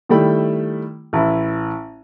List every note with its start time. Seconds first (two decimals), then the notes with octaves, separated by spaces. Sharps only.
0.09 D#3 G3 A3 E4 G5 B5
1.13 A1 E4